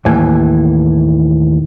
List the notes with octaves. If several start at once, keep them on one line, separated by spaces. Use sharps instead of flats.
D#2 A2 E3 G#5